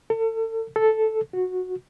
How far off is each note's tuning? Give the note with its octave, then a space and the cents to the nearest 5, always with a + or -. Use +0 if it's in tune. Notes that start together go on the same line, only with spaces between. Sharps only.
A4 +35
A4 -5
F#4 -10